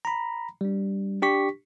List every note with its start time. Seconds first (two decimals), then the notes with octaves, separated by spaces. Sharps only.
0.05 A#5 B5
0.61 G3 D4
1.22 D4 G4 C#6 B6